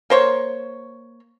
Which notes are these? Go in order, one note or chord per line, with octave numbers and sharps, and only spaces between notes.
A#3 C5 C#5